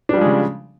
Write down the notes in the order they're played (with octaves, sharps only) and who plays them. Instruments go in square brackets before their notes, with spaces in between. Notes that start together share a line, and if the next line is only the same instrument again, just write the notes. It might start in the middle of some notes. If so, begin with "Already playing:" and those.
[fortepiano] D4
G3
F3
G#3
C#3